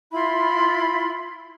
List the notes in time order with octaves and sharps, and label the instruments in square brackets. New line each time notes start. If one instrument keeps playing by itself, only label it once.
[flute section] E4 F4 B5 C6